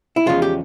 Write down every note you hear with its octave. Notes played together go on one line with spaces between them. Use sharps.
E4
E2 C#3 F3 G#3 F4
G4